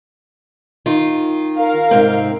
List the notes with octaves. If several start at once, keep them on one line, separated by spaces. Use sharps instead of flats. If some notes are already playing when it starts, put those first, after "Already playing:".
D#3 F4
A#4 F5
G#2 C3 C4